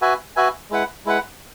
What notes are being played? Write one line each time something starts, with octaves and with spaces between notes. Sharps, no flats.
F#4 B4 E5 G#5
F#4 B4 E5 G#5
G#3 E4 B4 F#5
G#3 E4 B4 F#5